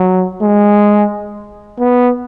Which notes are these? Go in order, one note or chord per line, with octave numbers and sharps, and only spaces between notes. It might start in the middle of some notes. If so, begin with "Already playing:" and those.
Already playing: F#3
G#3
B3